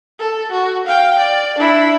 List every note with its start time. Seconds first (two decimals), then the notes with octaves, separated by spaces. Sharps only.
0.19 A4
0.51 F#4
0.86 F5 G5
1.19 D5
1.58 D4 E4